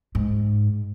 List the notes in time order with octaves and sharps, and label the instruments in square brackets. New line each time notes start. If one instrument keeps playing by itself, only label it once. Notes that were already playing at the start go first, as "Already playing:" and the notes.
[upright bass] G#2